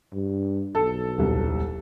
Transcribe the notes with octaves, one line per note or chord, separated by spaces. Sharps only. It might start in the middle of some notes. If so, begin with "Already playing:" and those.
G2
B1 A4
D#1 C2